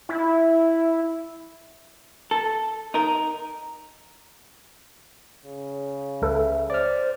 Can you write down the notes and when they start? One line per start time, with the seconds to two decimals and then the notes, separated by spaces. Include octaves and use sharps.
0.09 E4
2.31 A4
2.94 D#4 A#4
5.45 C#3
6.22 C#2 A4 B4 E5
6.70 C5 D5 F6